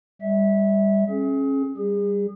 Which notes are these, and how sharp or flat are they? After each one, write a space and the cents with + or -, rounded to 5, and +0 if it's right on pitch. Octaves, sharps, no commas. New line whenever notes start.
G3 +20 E5 -20
C#4 -30 G#4 +35
G3 +0 G#4 -35